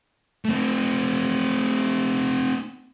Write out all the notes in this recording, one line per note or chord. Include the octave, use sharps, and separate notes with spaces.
A3 C4